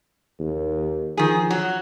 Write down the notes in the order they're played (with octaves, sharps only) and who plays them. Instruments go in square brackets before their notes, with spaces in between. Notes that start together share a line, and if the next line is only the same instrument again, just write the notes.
[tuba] D#2
[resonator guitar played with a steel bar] D#3 G#4 [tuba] F3
[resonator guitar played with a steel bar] F#3